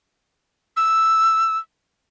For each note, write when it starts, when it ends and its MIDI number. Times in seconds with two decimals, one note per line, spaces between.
0.77 1.58 88